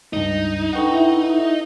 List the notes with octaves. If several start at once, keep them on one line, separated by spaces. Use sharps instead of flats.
C#2 G2 D#4
D4 A4 B4 F#5 G5 C#6
E4 E5